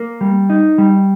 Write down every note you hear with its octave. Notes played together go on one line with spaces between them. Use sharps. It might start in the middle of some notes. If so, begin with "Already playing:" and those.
Already playing: A#3
G3
D#4
G3